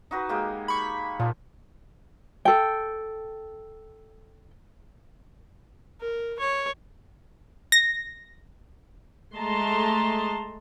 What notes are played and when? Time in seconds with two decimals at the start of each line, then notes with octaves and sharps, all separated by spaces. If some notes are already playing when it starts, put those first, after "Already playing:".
0.11 D#4 F#4 B4
0.29 G#3 A#3 G4
0.68 B5 C#6
1.19 A#2 F3
2.45 A4 G5
6.01 A#4
6.40 C#5
7.72 A#6
9.34 G#3 A3 D#5 A5 A#5 C6